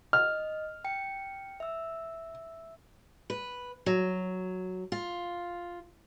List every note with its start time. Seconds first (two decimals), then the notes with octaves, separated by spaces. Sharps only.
0.13 D#5 F6
0.85 G5 C#7
1.60 E5 E6
3.30 B4
3.86 F#3
4.92 F4